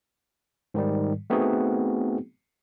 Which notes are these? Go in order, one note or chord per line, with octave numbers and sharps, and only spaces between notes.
G#2 D#3 G3
A3 B3 C4 D#4 F#4 G#4